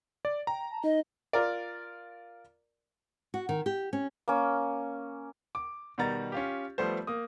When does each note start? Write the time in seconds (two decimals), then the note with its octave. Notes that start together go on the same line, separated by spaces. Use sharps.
0.25 D5
0.47 G5 A#5
0.72 A5
0.84 D#4 D#5
1.33 F4 A#4 D5
3.34 F#4
3.49 D#3
3.66 G4
3.93 C#4
4.28 A#3 C#4
5.55 D6
5.98 B2 D#3 G3 F#5 A#5 A6
6.32 C#4 F4 G4
6.78 F3 G3 A3 B3 C5
7.07 A#3 D#6